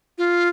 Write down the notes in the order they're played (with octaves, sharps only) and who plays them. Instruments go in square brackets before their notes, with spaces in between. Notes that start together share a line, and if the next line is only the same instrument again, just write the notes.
[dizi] F4